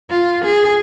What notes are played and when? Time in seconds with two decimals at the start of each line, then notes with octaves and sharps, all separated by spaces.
0.10 F4
0.45 G#4